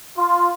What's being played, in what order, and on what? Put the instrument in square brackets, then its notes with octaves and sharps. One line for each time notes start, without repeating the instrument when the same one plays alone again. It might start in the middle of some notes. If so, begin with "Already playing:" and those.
[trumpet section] F4